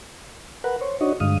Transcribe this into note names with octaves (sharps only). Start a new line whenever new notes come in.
A#4 B4 F#5
C5 C#5
D4 D#4 F#4 C#5 D#5
G2 D3 G#3 F5 D#6